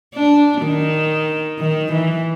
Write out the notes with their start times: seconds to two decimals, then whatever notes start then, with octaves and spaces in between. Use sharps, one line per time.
0.15 D4
0.62 D#3
1.59 D#3
1.92 E3